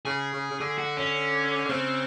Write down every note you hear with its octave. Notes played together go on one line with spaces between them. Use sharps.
C#3 G#4
C#3
C#3
D3 G#4
F#4
C#4
D3
C#3 C4